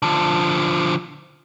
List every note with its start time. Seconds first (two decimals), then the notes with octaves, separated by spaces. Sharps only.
0.02 D3 F3